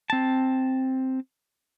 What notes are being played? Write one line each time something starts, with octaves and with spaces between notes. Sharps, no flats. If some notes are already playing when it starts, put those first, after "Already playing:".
C4 A5